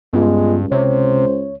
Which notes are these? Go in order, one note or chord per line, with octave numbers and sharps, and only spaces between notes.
C#2 G2 G#3 B3 F4
C3 C5 C#5